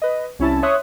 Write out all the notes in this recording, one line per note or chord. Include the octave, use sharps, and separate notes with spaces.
B4 D#5
C2 C#4 E4 A5
C#5 E5 C6 C#6 D#6 F#6